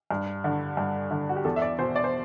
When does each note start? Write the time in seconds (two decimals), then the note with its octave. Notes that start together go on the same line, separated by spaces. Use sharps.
0.11 G2
0.44 D3
0.77 G2
1.11 D3
1.29 F#4
1.36 G4
1.45 E2 A4
1.56 E5
1.62 D5
1.79 B2 C5
1.96 D5
2.04 C5